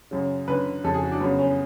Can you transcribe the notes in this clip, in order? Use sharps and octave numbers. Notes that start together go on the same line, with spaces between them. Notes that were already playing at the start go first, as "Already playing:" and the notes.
F#2 C#3
F#2 D3 B4
F2 C#3 A4
G#4
F#4
D4
F#2 C#3 B3
C#4